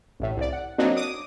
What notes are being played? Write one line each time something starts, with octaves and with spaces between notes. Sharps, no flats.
A1 A2
C2 D5
F#5
F#3 A#3 C4 D4 D#4
D6 D#6